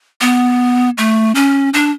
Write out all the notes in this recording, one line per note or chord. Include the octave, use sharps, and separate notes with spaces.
B3
A3
C#4
D4